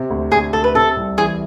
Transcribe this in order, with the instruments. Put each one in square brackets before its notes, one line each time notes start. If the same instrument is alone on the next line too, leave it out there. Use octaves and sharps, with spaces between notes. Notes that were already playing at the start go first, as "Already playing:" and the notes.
Already playing: [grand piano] C3
D2
[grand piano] D2 [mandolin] G#4
[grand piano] D2 [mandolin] A4
[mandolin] B4
[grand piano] C3 [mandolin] A4
[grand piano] C2
[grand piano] E3 [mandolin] G#4